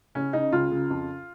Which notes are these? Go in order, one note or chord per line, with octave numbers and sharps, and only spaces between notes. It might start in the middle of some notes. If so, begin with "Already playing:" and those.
C#3 C#4
C#3 D#4
C#2 F4
C#3
F2